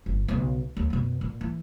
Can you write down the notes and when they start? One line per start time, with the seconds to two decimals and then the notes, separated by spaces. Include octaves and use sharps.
0.06 G1
0.28 B1 C#3
0.77 D#2
0.90 F#2 B2
1.21 A#2
1.41 E3